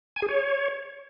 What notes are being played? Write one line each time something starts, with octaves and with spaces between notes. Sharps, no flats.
G#5
G#4
C#5